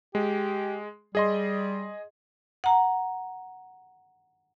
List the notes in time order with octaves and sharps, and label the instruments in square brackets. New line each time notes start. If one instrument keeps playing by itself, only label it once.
[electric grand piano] G#3 [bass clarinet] G4
[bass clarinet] G3 [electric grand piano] G#4 D#5 C6
[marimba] F#5 A#5